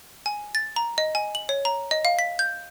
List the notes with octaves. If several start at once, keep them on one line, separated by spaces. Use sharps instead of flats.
G#5
A6
A#5
D#5
G#5
F#7
C#5
A#5
D#5
F5
B6
G6